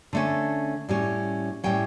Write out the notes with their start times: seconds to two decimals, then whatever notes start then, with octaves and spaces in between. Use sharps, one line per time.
0.13 D3 A3 C#4
0.89 A2 G3 C#4
1.64 A2 G3 C#4 G5